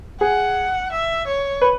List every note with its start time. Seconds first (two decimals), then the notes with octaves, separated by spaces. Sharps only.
0.21 G#4 F#5
0.92 E5
1.27 C#5
1.61 B4